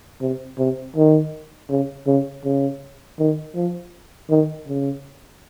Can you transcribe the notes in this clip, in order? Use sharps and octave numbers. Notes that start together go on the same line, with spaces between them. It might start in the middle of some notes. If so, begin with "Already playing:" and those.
C3
C3
D#3
C#3
C#3
C#3
D#3
F3
D#3
C#3